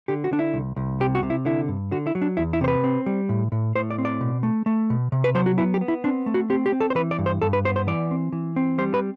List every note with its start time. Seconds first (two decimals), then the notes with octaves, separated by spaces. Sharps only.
0.08 D3 G4
0.24 F#4
0.31 D3 D4
0.39 E4
0.54 C2
0.76 C2
1.00 C3 G4
1.15 F#4
1.23 C3
1.30 E4
1.45 D3 E4
1.68 G2
1.91 D3 F#4
2.07 E4
2.15 F#3
2.22 D4
2.37 E2 E4
2.53 E4
2.61 C3 C5
2.68 B4
2.84 C4
3.06 G3
3.29 A2
3.52 A2
3.75 A2 C5
3.90 D5
3.98 C4
4.05 D5
4.21 B2
4.43 A3
4.66 A3
4.90 B2
5.12 C3
5.24 B4
5.35 F#3 C5
5.46 F#4
5.58 B3 E4
5.74 G4
5.81 B3
5.88 E4
6.04 C4 D4
6.26 A3
6.34 F#4
6.50 C4 G4
6.66 G4
6.72 C4
6.80 A4
6.90 C5
6.95 E3 B4
7.11 D5
7.19 G2
7.26 C5
7.42 G2 A4
7.53 B4
7.65 B3 C5
7.76 C5
7.87 E3 D5
8.11 C4
8.33 E3
8.56 C4
8.78 G3 C5
8.94 B4